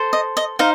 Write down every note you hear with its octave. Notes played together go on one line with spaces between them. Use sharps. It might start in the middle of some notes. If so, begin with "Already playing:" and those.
Already playing: A4 C5
D#5
D#5
D#4 C5 F5